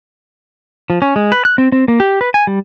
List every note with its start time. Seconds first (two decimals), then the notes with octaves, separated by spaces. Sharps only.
0.90 F3
1.02 C#4
1.16 G#3
1.32 B4
1.45 F#6
1.58 C4
1.72 C4
1.88 A#3
2.00 G4
2.21 B4
2.34 G#5
2.47 G3